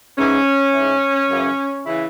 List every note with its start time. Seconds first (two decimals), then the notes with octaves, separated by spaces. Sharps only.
0.18 G#2 E3 C#4
0.74 G#2 E3
1.30 F#2 C#3 E3
1.85 C#3 E3 E4